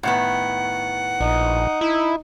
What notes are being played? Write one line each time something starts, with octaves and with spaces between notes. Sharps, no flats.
A2 D#3 B3 F#5
A#1 D#4
E4